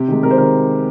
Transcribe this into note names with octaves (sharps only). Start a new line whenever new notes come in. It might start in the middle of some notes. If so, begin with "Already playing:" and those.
Already playing: C3 G4
D#3 G#3
C3 A#4
C5
D#3 G#3 A#4